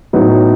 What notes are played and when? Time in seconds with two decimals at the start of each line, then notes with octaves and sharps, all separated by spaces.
0.13 A2 F#3 B3 D#4 F#4